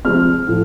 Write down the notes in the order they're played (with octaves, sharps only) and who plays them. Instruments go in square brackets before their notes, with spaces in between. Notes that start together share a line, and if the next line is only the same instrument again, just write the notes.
[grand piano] C3 F3 G#3 C4 F6
A2 F3